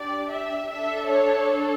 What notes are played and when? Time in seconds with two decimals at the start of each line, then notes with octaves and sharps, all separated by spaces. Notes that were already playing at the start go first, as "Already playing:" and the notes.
Already playing: D4 G4 D5
0.31 E5
0.70 D4 A4 E5
1.09 C#5